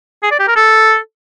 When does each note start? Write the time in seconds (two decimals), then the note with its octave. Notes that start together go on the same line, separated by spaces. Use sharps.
0.23 G#4
0.31 D5
0.39 G4
0.48 A#4
0.56 A4